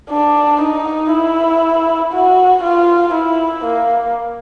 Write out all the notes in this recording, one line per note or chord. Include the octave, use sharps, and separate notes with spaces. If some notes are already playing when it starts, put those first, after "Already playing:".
D4
D#4
E4
F#4
F4
E4
A#3